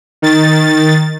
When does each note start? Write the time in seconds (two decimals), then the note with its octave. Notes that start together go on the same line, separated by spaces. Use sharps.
0.22 D#3 A6